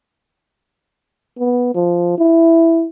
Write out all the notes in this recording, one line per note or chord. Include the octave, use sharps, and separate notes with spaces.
B3
F3
E4